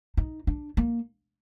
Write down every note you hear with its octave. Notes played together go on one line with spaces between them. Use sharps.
D#4
D4
A#3